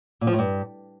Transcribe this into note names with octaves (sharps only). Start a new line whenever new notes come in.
A#2
F3
A2
G2